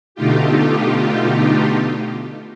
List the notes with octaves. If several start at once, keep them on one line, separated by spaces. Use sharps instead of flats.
B2 D3 A3 D#4 F4 G4